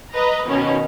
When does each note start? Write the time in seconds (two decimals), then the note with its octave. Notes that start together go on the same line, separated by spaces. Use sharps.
0.14 B4 D#5 A#5
0.47 B2 D#3 C#4